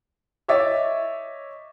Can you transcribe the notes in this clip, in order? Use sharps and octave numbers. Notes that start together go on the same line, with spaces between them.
C#5 D#5 E5 D6 A6